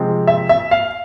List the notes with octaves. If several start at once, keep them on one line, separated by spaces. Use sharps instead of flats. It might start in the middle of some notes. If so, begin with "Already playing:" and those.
Already playing: C3 F3 G#3 C4
E5
E5
F5